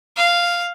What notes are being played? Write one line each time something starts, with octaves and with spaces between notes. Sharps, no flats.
F5